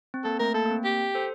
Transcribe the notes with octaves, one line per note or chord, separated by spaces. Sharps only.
C4
A#3 A4
A3 A#4
A#3 A4
A#3
C4
G4
A4 C5